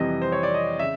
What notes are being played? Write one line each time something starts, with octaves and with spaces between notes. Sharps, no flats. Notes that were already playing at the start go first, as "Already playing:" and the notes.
Already playing: F2 C3 E3 G3 D#5
C5
C#5
D5
D#5
C#3 E5